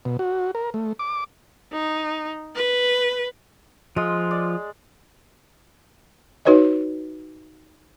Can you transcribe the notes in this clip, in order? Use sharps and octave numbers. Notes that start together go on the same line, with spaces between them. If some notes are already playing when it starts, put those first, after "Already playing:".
B2
F#4
A#4
A3
D6
D#4
B4
F3 G#3 F4
D5
D#4 F#4 B4 C#5 D#5